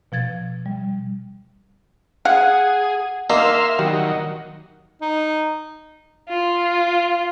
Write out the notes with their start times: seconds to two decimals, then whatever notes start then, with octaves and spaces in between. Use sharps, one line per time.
0.12 B2 F3 G#6 A6
0.66 G3
2.25 G#4 F5 F#5
3.30 A#3 D#4 E5 F5 C6
3.79 D#3 F#3 G3
5.02 D#4
6.29 F4